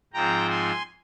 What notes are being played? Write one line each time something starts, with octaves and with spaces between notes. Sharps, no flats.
G#2 F3 C4 G5 A#5
G#5 C6